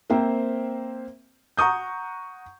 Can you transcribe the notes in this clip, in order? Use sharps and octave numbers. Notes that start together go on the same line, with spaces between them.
A#3 C4 C5 E5 G5
F#5 A#5 C#6 D#6 G6